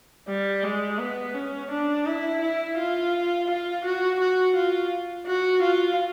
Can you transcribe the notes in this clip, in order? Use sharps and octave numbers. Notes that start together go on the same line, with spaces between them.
G3
G#3
B3
C#4
D4
E4
E4
F4
F4
F#4
F#4
F4
F#4
F4